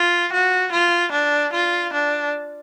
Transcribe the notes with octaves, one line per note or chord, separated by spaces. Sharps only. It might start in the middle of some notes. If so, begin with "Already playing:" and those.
Already playing: F4
F#4
F4
D4
F4
D4